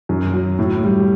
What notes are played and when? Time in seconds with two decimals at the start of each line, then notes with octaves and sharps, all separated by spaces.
0.09 F#2
0.33 F#3
0.59 A2
0.83 G3